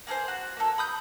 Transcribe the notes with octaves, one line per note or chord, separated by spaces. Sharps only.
A#3 G#4 A4 C5
F#4
A#3 A4
B5 D#6 G6